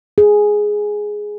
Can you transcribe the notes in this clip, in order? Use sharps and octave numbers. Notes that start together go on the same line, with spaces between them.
G#4